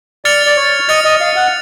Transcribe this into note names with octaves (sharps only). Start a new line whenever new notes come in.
D5 F6 A6 C#7 F7
D5
C#5
D#5 F6 A6 C#7 F7
D#5
F5
F#5